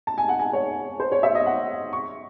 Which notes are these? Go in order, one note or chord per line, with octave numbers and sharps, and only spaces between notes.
A5
G#5
F#5
G#5
C#5
C5
C#5
E5
D#5
F#5
C#6